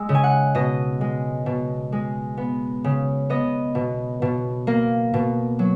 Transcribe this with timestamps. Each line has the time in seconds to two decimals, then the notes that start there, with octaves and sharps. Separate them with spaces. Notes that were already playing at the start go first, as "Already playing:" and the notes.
Already playing: G#3 E6
0.09 C#3
0.15 G#5
0.24 F#5
0.55 B2 D#5
1.01 G#3
1.46 B2
1.92 G#3
2.37 B3
2.84 C#3
3.30 B3 D#5
3.75 B2
4.22 B2
4.67 A#3
5.14 B2
5.59 F#3